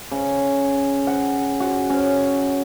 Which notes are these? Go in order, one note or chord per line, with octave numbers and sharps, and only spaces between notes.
C#3
F#5
F#4
C#4